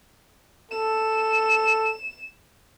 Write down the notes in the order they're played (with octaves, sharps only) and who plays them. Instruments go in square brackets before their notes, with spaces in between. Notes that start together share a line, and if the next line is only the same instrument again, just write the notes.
[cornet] A4 [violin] E7